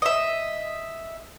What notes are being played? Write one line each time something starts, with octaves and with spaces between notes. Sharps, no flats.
D#5 E5